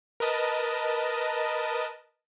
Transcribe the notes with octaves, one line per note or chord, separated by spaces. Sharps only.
A#4 B4 D#5 A5